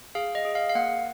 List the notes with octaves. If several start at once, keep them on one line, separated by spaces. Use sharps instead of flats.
G#4 F5
D#5
G#4
F5
F5
A#3 F#5